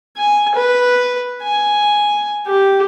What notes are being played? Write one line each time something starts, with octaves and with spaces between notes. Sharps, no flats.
G#5
B4
G#5
G4